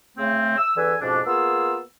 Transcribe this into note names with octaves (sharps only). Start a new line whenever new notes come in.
C#3 A3 C4
E6
E2 D3 E3 B4 G#5 E6
F2 G#2 B2 C#4 D4
A#3 B3 F4 G#4 E6